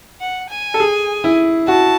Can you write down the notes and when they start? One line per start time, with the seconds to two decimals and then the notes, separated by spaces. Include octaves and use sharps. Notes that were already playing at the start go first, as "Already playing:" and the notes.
0.21 F#5
0.50 G#5
0.74 A4
0.80 G#4
1.24 E4
1.68 F#4 A5